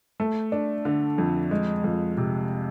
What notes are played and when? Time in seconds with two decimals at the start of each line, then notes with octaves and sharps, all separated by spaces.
0.20 A3
0.52 D4
0.85 D3
1.18 F2
1.51 G#3
1.84 F2
2.17 C3